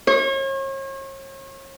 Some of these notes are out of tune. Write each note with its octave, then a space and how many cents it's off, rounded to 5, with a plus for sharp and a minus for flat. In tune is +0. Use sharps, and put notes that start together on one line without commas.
C#5 -40